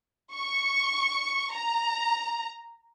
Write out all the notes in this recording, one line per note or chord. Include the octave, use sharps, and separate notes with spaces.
C#6
A#5